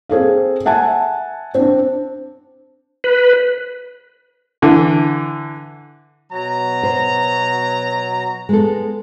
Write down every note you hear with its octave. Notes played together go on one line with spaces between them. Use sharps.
C4 G#4 A4 F5
E5 F#5 G#5 A5
C4 D4
B4
D3 E3
B2 F#3 A#5
C5
G#3 B3 A4